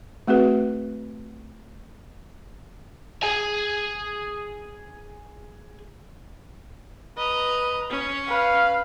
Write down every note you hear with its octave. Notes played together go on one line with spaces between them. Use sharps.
A3 C4 F#4 G#4 B4
G#4 G#5
B4 D#5 A#5
C#4
B4 F5